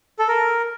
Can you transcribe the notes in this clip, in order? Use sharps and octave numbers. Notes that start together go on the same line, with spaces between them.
A4
A#4